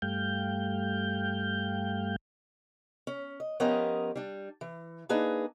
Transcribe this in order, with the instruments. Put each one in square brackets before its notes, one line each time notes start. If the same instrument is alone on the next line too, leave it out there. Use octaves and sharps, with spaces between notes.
[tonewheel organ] G2 G3 A3 F5 G5 G6
[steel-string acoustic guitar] C#4
D#5
F3 B3 C#4 G4 A#4 D#5
G3 D4
E3
A#3 D4 D#4 G#4 B4